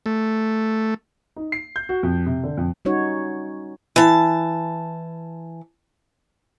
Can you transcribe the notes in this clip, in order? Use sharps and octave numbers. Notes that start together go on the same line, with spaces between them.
A3
D#4
C7
G6
F#4
F2
C3
D3
F2
G3 C#4 D#4 F#4 C#5
E3 A5